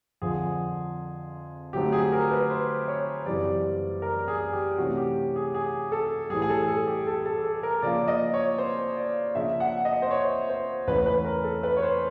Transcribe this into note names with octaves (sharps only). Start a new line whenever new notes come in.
F2 D3 F3 G#4
D3 F#3 A3 C4 D#4 G4
G#4
A#4
B4
C5
C#5
F#2 C#3 E3 G3 C4 D5
A#4
G#4
G4
C3 E3 A3 C#4 F#4
G4
G#4
G#4
A4
A2 E3 G3 G#4
G#4
A4
A4
G4
A4
A4
A4
A#4
C#3 F3 A#3 D5
D#5
C#5
C5
D5
C#3 F3 A#3 D4 E5
F#5
D#5
C5
C#5
C5
E2 C#3 E3 A3 C#4 B4
B4
A#4
A4
B4
C#5
C5